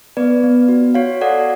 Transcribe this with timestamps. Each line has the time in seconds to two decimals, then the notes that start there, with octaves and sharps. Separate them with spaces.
0.17 B3 B4 D5
0.43 B3
0.69 F#4
0.95 F#4 C#5 F5
1.21 A4 D5 F#5